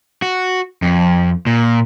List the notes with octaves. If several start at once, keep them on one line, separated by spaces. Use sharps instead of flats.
F#4
F2
A#2